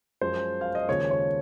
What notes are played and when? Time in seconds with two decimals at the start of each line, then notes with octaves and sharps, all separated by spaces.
0.21 F#2 F3 G#3 C5
0.61 F5
0.75 D#5
0.88 D#2 C#3 F3 G#3 C#5
1.11 C#5